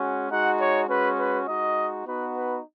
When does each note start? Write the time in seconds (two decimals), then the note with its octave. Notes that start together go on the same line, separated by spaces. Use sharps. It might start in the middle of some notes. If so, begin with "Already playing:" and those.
Already playing: G#3 C#4 F#4
0.30 G#3 D#4 F#4 F#5
0.59 C#5
0.88 G#3 C#4 F#4 B4
1.18 B4
1.47 G#3 D#4 F#4 D#5
2.05 B3 D#4 F#4 B4
2.35 B4